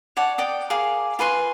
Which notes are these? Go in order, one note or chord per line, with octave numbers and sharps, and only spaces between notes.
C#5 D5 F#5 A5
D5 G5 D#6
G#4 A#4 F5 D6
F4 B4 G#5 C6